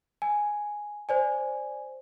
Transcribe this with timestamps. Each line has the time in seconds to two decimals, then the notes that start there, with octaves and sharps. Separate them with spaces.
0.22 G#5
1.09 C5 D5 G#5